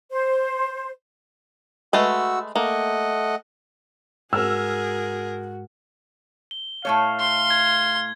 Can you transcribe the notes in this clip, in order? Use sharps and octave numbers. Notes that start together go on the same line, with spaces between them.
C5
G#3 A3 F#4 B4 E6
A3 A#3 D#5 F#5
G#2 F#4 G#4 A#4 E6 F6
G7
A2 A3 C#5 F5
C6
G#6